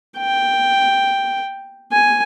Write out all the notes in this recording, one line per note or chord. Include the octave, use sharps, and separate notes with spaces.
G5
G#5